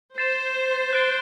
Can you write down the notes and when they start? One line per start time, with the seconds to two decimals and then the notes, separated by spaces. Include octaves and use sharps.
0.18 C5 A6 C7 E7
0.93 F#6 A6 D7 G7